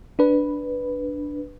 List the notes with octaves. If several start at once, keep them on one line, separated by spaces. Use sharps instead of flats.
D4 B4